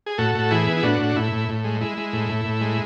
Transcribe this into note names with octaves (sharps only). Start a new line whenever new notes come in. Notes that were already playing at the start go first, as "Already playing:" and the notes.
G#4
A2 F#4 A4
A2
E3 E4 G#4
B3
E4
A2 D4 F#4
A2
A2 E4
A2
A2
G#3
G#3 E4
G#3
A2
A2
A2
G#3